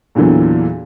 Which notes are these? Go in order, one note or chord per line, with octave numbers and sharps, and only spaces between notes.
E2 A#2 D3 E3 F#3